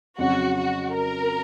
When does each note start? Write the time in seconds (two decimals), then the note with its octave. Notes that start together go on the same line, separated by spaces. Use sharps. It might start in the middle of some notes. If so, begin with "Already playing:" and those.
0.18 F2 C#3 F#3 F#4
0.57 F#4
0.95 A#4